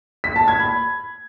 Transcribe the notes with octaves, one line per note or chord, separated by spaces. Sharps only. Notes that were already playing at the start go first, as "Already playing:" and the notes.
B6
A5
G#6
B5